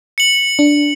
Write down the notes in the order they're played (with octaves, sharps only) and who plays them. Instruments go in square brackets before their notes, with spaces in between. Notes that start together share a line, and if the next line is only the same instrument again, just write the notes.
[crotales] C#7 F#7
[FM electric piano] D4